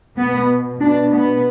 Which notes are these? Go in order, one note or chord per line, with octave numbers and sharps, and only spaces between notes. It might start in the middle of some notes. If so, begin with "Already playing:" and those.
B2 B3
B2 D4
B3